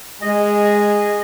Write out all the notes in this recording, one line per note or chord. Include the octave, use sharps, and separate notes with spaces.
G#3 G#4 D#5